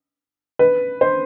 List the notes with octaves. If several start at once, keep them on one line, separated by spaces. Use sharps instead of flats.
B4
C5